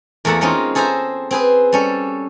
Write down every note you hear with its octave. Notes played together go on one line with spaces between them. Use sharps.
E2 A3 A#3 A4 F#5 A5
G#3 C4 C#4 D#4 F4
G#4 A4 C5 E5 G#5 A#5
C4 G#4 B4
G3 C#4 A4